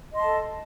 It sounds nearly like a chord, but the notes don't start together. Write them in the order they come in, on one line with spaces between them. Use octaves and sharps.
D#5 C6 A5 A4